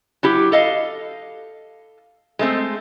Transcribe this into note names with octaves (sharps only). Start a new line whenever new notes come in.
F#3 E4 G4
A4 D#5 F5
G#3 A3 C4